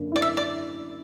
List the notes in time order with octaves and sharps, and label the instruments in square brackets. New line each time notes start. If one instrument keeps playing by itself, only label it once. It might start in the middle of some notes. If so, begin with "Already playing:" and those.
Already playing: [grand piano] F#2 D3 A#3
[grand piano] E4 [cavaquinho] D5
[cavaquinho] E5
D5